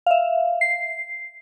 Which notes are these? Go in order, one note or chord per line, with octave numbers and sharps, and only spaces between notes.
E5 F5
C7